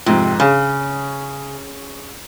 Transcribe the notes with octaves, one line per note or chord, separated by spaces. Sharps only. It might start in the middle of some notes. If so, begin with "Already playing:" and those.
F2 G#2 C3 F3
C#3 C#4 G#4